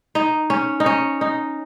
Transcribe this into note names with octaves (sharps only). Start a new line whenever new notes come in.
D#4
C#4
D#4
C#4
D#4